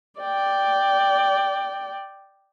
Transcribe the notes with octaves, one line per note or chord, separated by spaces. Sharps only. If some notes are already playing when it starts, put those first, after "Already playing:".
D5 G5